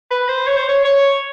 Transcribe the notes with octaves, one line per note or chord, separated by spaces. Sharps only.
B4
C5
C#5
C5
C#5
C#5